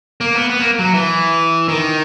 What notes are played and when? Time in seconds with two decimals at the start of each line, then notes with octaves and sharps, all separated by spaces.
0.21 A#3
0.35 B3
0.50 B3
0.60 A#3
0.79 F#3
0.94 E3
1.68 D#3